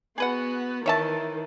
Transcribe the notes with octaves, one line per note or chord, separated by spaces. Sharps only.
B3 F#4 G#4 B4 F#5
D#3 E3 C#5 E5 A5